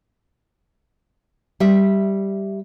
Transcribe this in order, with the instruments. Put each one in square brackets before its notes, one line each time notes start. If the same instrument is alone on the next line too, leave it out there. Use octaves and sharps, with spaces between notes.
[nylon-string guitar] G3 E5